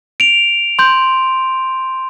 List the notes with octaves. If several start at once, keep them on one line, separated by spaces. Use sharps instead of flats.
D7 F7
C6 G6